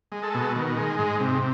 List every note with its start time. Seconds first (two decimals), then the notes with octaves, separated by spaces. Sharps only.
0.12 G#3
0.23 A4
0.34 B2
0.56 D#3
0.77 G#3
0.99 G#2
1.20 C3